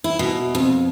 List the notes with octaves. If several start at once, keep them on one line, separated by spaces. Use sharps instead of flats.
E4
B2
F2